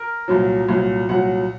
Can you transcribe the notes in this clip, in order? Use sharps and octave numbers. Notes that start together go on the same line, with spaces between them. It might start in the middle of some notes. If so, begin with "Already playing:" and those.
Already playing: A#4
C2 A#2 F#3
C2 A#2 F#3
C2 A#2 F#3 F#5